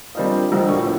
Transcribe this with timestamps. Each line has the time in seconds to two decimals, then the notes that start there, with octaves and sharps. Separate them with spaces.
0.15 G3 A#3 C4 D4 F4 D#5
0.52 C2 D3 C5 D#5 G5
0.69 D2 A#2 G3 A#3 C#6
0.82 A2 F3 B3